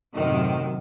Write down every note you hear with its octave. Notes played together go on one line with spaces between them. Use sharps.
F#2 A2 C3 D#3